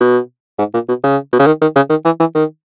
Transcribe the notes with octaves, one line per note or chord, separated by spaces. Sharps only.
B2
G#2
A#2
B2
C#3
B2
C#3
D#3
D#3
C#3
D#3
E3
E3
D#3